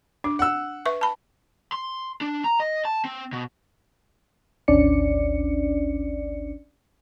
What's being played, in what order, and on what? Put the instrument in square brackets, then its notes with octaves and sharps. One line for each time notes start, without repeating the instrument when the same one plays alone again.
[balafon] D4 [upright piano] D6
[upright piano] F#5 E6
[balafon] B4 E5 C#6
A5 B5
[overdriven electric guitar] C6
D4
A#5
D#5
A5
C4
B2
[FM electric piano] G#1 D2 C#4 D4 D5 C#7